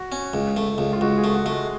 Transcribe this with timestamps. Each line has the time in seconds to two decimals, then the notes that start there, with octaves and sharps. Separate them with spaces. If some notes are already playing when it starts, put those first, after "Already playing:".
Already playing: F#4
0.12 C#4
0.33 C#2
0.57 A3
0.78 C#2
0.93 F4
1.01 C#2 F#4
1.18 G#4
1.24 A3
1.34 F#4
1.46 A3
1.51 G#3